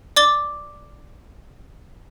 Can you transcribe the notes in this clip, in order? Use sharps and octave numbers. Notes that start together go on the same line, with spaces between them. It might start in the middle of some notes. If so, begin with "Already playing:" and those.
D5 D6 A6 G7